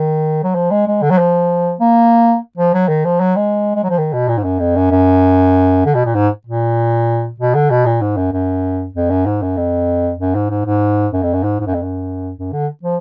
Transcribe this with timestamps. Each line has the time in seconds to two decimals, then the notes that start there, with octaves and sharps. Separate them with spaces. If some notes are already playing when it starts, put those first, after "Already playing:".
Already playing: D#3
0.44 F#3
0.55 F3
0.71 G#3
0.87 G#3
1.02 D3
1.11 F#3
1.18 F3
1.80 A#3
2.58 F3
2.74 F#3
2.88 D#3
3.05 F3
3.20 F#3
3.36 G#3
3.76 G#3
3.84 F#3
3.90 F3
3.98 D#3
4.13 B2
4.28 A#2
4.38 G#2
4.44 F#2
4.60 F2
4.76 F#2
4.91 F#2
5.86 D3
5.95 B2
6.06 A#2
6.15 G#2
6.47 A#2
7.40 B2
7.55 D3
7.71 B2
7.86 A#2
8.02 G#2
8.17 F#2
8.33 F#2
8.95 F2
9.10 F#2
9.26 G#2
9.42 F#2
9.57 F2
10.20 F#2
10.35 G#2
10.50 G#2
10.66 G#2
11.13 F#2
11.23 F2
11.34 F#2
11.44 G#2
11.60 G#2
11.67 F#2
11.74 F2
11.82 F#2
12.37 F#2
12.53 D3
12.83 F3